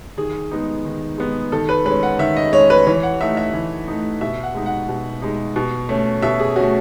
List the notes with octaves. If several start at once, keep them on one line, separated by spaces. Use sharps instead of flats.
D#3 G#4
G#3 B3 D#4
D#3
G#3 B3 D#4
D#3 A4
B4
G#3 C#4 B4
F#5
D#3 E5
D#5
G#3 C#4 C#5
B4
E3 C#5
F#5
A3 D#4 E5
E5
E3
A3 D#4
B2 E5
F#5
G#3 D#4
F#5
B2
G#3 D#4
B2
A3 C#4
B2 E5
G#4
A3 C#4 F#4